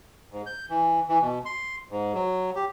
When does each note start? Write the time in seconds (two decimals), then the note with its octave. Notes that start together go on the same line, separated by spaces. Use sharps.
0.32 G#2
0.46 G6
0.70 E3
1.09 E3
1.22 B2
1.45 C6
1.91 G#2
2.14 F#3
2.56 G4